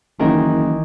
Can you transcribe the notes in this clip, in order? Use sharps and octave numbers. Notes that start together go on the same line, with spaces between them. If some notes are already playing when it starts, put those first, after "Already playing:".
F#1 D#3 E3 A#4
F#1